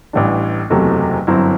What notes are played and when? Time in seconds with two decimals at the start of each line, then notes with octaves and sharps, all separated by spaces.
0.13 A1 A2 E3 G3 D4
0.70 F#1 E2 C3 F#3 A3
1.27 G1 F#2 F#3 C4 E4